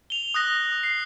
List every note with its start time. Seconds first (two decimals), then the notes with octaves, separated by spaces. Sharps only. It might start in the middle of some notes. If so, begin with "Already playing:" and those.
0.10 F7 G7
0.34 D#6 F#6 A#6
0.83 C7